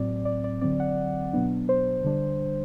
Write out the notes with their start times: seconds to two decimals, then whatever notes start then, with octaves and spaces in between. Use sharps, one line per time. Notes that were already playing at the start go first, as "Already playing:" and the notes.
Already playing: A2 F#3 C4 D5
0.25 D5
0.44 D5
0.61 D3 F#3 C4 D5
0.80 F#5
1.33 B2 F#3 B3 D4
1.69 C5
2.04 D3 G3 D4